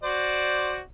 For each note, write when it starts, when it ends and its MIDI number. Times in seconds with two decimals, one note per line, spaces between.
0.03 0.80 66
0.03 0.80 72
0.03 0.80 74